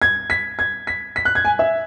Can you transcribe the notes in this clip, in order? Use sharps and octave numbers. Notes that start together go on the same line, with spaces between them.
G#6
B6
G#6
B6
B6
F#6
G#6
G#5
E5